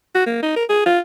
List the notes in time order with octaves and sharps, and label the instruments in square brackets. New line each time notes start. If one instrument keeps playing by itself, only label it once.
[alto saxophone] F#4
A#3
D#4
A#4
G#4
F4